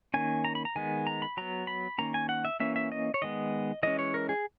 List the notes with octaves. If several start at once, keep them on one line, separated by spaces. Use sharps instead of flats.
D#3 A#3 C#4 G#5
A#5
B5
A#5
D#3 G#3 B3 G#5
A#5
B5
F#3 B3 A#5
B5
D#3 A#3 C#4 A#5
G#5
F#5
E5
E3 A#3 C#4 E5
E5
D#5
C#5
D#3 G#3 B3 D#5
E3 G#3 C#4 D#5
C#5
A#4
G#4